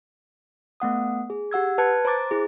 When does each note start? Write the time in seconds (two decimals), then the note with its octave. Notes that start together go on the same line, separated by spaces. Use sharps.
0.80 A3 B3 F#5 D#6
1.30 G#4
1.51 G4 F#5 E6 G#6
1.78 B4 A5 F#6 G#6 C#7
2.05 C5 A#5 C6 D6 A6
2.31 E4 G#4